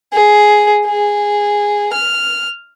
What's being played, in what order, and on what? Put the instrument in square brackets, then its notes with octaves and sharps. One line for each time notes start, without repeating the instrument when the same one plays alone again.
[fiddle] G#4
G#4
F6